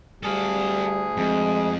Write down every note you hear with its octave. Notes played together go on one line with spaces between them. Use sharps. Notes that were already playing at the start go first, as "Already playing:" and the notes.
D2 G3 G#4 A4 F5
F2 G#3